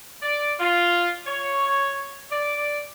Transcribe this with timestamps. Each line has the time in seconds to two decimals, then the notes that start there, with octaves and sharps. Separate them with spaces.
0.23 D5
0.60 F4
1.26 C#5
2.31 D5